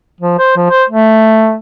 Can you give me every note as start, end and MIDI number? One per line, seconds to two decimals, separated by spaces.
0.20 0.37 53
0.38 0.55 72
0.57 0.66 53
0.70 0.83 72
0.89 1.55 57